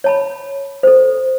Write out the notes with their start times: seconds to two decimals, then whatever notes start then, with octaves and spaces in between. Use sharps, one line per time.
0.04 C#5 A5 B5
0.83 A4 C5